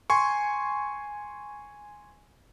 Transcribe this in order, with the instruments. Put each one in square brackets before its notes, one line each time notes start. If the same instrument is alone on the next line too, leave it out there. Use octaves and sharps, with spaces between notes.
[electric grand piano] G#5 C6 C#6